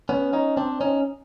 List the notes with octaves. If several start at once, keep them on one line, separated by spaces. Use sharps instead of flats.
B3 C#4
C#4 D#4
C4 D4
C#4 D#4